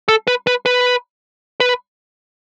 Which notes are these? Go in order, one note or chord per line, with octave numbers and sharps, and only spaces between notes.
A4
B4
B4
B4
B4